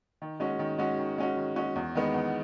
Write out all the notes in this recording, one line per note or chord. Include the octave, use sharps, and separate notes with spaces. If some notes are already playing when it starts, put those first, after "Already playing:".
D#3
G#3 C#4 F#4
D#3
G#3 C#4 F#4
D#3
G#3 C#4 F#4
D#3
G#3 C#4 F#4
E2
D#3 G#3 B3
E2